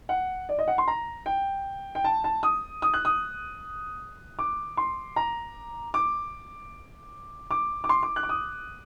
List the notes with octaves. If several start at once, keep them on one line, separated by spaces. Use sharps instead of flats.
F#5
D5
D#5
F#5
C6
A#5
G5
G5
A5
A5
D#6
D#6
F#6
D#6
D6
C6
A#5
D6
D6
D6
C6
D6
F#6
D6
D#6